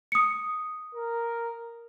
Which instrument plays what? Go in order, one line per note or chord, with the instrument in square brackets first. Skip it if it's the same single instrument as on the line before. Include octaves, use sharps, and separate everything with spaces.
[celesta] D#6 C#7
[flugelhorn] A#4